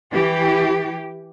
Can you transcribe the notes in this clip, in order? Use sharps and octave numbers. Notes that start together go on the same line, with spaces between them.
E3 G4